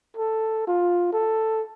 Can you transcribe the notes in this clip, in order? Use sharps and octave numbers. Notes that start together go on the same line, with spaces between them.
A4
F4
A4